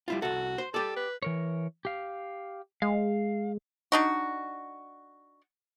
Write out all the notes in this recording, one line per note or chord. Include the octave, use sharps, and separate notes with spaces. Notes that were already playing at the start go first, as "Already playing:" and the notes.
G3 E4 F4
C2 F#4 A4
C5
G4 A4 D5
B4
E3 A#4 C#5
G4 F5
G#3 F5
D4 D#4 F#4